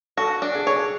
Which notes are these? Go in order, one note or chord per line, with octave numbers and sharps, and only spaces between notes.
F#4 A4
D4
G#4
C#5